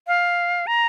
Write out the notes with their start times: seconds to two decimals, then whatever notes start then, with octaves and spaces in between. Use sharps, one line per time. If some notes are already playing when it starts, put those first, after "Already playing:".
0.07 F5
0.67 A#5